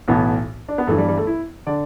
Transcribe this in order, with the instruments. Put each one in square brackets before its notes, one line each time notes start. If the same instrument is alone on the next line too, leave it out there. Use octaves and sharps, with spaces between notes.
[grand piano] B1 A2 E3 B3
D4
B3
G1 G2 E3 A3
G3
G3
A3
E4
D3 D5